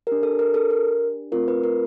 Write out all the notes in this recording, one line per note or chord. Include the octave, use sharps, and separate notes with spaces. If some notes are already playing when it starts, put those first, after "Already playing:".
D4 G4 A#4
A4
A#4
A4
A#4
A3 C4 F4 A#4
B4
A#4